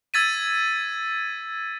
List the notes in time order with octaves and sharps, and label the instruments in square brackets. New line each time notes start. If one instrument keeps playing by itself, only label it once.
[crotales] E6 G#6 A6 B6 D#7